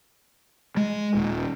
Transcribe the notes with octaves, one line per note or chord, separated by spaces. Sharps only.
G#3
D#1